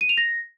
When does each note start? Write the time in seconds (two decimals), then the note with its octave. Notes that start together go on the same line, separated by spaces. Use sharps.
0.01 D#7
0.09 F7
0.17 A#6